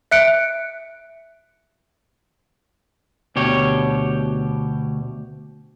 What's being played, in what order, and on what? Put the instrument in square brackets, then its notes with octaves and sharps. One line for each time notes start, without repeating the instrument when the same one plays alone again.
[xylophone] E5 F#6 C#7 D7
[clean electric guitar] D2 B2 G4 C#5